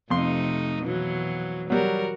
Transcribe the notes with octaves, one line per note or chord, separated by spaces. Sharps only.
F2 C3 A3 D#4 C6
B2 E3 F#3
F#3 G3 F#4 A#4